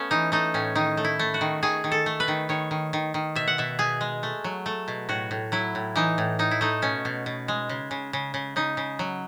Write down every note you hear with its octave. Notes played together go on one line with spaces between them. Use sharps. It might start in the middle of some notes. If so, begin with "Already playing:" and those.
Already playing: A3 B3 C#4
E3 D#4
A3 D#4
A2 C#4
D#3 D#4
A3
E4
A3
F#4
D#3
D#3 G#4
D#3
A4
A3
B4
D#3
D#3 C#5
D#3
D#3
D#3
B2 E5
F#5
B2 E5
B2 G#4
G#3
A3
F#3
A3
B2
A2 F#4
A2
F#3 E4
A2
E3 D#4
A2
A2 D#4
E4
A3 D#4
B2 C#4
B2
B2
G#3
C#3
C#3
C#3
C#3
C#3 D#4
C#3
F#3